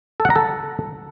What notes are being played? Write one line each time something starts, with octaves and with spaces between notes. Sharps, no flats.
A4
F#5
A#5
A4